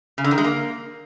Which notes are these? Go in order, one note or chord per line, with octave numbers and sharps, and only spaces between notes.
C#3
D3
D#3
G#3
A#3